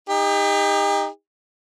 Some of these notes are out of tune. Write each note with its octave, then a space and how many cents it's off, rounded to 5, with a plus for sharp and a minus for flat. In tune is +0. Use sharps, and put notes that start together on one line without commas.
D#4 +0 G4 +40